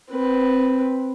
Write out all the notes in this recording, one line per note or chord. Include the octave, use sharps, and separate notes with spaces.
C4 B4